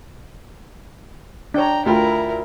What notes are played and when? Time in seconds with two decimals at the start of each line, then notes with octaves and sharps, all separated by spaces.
1.54 D4 C#5 G5 A#5
1.86 D2 E4 F4 A#4 G5